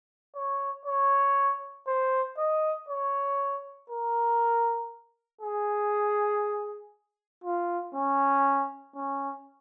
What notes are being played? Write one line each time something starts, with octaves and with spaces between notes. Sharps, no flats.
C#5
C#5
C5
D#5
C#5
A#4
G#4
F4
C#4
C#4